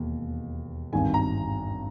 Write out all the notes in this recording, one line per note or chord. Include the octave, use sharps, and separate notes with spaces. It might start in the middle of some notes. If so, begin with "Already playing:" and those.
Already playing: E1 D#2
G#1 G2 D#3 G#5
A#5